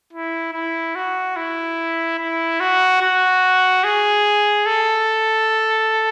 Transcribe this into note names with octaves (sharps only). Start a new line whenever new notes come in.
E4
E4
F#4
E4
E4
F#4
F#4
G#4
A4